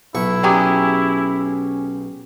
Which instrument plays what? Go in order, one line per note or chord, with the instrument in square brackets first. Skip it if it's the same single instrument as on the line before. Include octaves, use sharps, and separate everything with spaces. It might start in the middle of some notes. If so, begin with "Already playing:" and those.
[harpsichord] B1 C#6 [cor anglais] E4
[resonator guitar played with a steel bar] F#3 G4 G#4 [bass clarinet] C#4